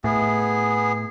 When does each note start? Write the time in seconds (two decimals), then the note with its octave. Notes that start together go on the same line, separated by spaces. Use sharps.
0.04 A2 B3 G#4